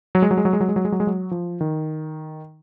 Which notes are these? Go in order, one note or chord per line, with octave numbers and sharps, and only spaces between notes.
F#3
G#3
F#3
G#3
F#3
G#3
F#3
G#3
F#3
G#3
F#3
G#3
F#3
F3
D#3